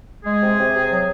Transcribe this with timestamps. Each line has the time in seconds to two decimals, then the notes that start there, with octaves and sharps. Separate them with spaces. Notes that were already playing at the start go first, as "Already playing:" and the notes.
0.24 G#3 G#4
0.42 C3
0.58 C3
0.74 C3
0.91 F#3